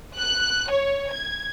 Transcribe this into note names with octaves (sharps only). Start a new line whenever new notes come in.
F#6
C#5
G#6